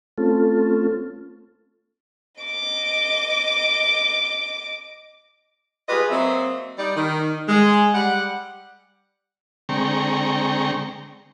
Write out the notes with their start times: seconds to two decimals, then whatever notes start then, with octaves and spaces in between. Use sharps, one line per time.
0.18 A3 C4 C#4 F4 A4
2.42 D#5 D6
5.89 F4 G4 G#4 B4 D#5
6.10 F#3 A#3 C4 D#5 E5
6.78 G3 D#4 D5
6.96 D#3
7.49 G#3
7.94 G3 F#5
9.69 D3 G#3 C4 G5 A#5 C#6